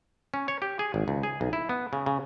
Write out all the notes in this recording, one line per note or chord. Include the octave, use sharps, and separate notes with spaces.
C#4
C#5
G4
G#4
G#1
C#2
G#4
B1
E4
B3
C#3
C#3